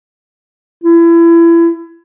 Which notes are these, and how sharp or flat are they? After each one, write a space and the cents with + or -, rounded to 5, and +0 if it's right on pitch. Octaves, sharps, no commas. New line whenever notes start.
E4 +30